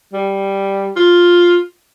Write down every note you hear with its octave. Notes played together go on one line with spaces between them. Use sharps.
G3
F4